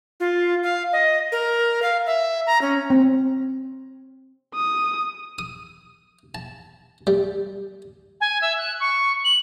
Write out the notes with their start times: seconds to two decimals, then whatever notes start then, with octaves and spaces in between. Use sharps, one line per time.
0.20 F4
0.63 F5
0.93 D#5
1.32 A#4
1.82 F5
2.06 E5
2.47 A#5
2.62 C#4
2.90 C4
4.55 D#6
5.39 D#6
6.35 A5
7.07 G3
8.21 G#5
8.42 E5
8.58 F#6
8.80 C#6
9.24 F#7